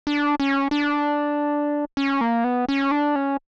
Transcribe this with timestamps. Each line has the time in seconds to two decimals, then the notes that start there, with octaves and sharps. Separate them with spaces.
0.07 D4
0.40 C#4
0.71 D4
1.97 C#4
2.21 A#3
2.44 B3
2.69 C#4
2.91 D4
3.16 C#4